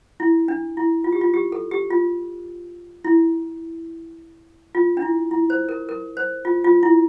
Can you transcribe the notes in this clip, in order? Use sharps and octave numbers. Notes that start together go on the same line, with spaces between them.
E4
D4
E4
F4
G4
F4
G4
A4
G4
F4
E4
F4
D4
E4
E4
C5
A#4
A#4
C5
F4
F4
E4